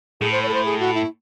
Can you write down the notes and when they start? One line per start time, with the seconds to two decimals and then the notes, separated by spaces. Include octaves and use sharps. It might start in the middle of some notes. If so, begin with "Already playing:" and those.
0.21 A2 G#4
0.32 C5
0.43 C#5
0.48 A4
0.54 C5
0.65 G#4
0.80 F#4
0.94 E4